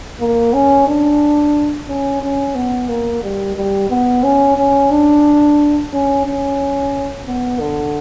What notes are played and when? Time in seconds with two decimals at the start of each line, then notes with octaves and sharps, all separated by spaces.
0.20 A#3
0.54 C#4
0.87 D4
1.88 C#4
2.23 C#4
2.55 B3
2.89 A#3
3.23 G3
3.57 G3
3.90 B3
4.23 C#4
4.57 C#4
4.91 D4
5.93 C#4
6.26 C#4
7.27 B3
7.60 D3